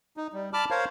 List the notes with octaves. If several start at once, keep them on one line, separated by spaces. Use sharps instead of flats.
D#4
G3
A5 B5 D6 F6
A#4 C5 C#5 F5